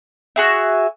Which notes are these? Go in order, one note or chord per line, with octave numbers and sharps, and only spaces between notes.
F#4 G#4 E5